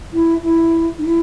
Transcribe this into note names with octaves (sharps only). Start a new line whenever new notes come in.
E4
E4
D#4
E4